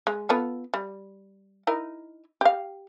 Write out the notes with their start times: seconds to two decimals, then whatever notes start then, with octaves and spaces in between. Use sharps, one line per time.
0.07 G#3
0.29 B3 F4 A4
0.74 G3
1.67 D#4 E4 A#4
2.41 G4 F5